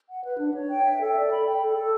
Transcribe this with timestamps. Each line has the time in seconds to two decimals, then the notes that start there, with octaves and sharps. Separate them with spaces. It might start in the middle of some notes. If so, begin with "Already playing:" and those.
0.08 F#5
0.24 B4
0.39 D4
0.54 C#5
0.70 G5
0.85 E5
1.00 A4
1.15 D5
1.30 B5
1.46 G5
1.61 A4
1.76 A4